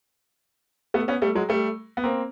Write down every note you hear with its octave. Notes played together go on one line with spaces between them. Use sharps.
A3 B3
B3 C#4
G3 A3
F#3 G#3
G3 A3
B3
A#3 C4